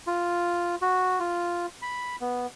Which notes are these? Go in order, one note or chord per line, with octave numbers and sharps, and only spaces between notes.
F4
F#4
F4
B5
B3